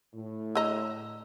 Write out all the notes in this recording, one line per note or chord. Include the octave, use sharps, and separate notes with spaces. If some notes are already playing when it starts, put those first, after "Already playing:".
A2
D3 D#5 A#5 E6